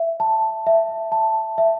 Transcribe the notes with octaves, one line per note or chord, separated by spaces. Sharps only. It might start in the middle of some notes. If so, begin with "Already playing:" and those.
Already playing: E5
A5
E5
A5
E5